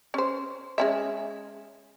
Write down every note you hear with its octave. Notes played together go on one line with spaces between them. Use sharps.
C#4 C5
G#3 C#4 E5